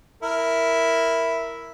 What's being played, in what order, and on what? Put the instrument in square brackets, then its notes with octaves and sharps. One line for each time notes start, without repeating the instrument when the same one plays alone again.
[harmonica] E4 A#4